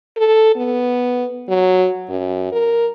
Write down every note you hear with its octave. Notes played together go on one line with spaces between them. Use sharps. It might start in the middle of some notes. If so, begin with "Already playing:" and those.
A4
B3
F#3
F#2
A#4